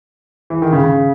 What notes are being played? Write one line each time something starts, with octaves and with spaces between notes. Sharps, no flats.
E3
D#3
C#3
C#3